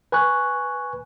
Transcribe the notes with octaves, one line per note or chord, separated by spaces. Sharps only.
B4 G#5 C#6 F#6